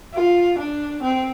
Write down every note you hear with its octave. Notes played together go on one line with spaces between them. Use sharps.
F4
D4
C4